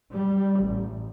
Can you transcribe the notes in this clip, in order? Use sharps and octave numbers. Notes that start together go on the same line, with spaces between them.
G3
A1